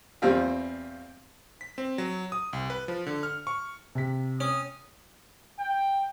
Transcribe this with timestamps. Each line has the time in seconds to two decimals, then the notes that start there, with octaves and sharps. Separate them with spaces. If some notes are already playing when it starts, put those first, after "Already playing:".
0.22 E2 G3 C4 F4
1.61 B6
1.78 C4
1.98 F#3
2.32 D#6
2.53 C2
2.70 B4
2.88 F3
3.07 D3
3.23 F6
3.47 C#6
3.95 C3 B6
4.40 C#4 D#6
5.58 G5